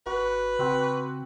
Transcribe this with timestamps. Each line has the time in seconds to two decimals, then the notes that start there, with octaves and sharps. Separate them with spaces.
0.06 G#1 F#4 B4
0.59 C#3 C4 F#4